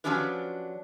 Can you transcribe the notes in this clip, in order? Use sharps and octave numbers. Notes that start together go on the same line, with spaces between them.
F3 F#3 C#4 D4 G4 B4